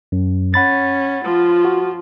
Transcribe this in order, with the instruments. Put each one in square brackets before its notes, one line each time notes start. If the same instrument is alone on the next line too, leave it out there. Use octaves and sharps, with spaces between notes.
[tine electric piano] F#2
[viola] C#4 [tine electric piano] F#5 B5 A6
[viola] F3 F4
[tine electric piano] F#4